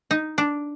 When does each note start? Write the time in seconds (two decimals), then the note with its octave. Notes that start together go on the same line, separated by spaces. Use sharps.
0.11 D#4
0.38 D4